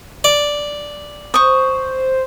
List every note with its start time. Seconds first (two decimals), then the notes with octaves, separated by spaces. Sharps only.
0.24 D5
1.34 C5 C#6 D#6